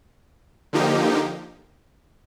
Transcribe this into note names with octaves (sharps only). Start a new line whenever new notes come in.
D3 F3 A#3 D#4 G4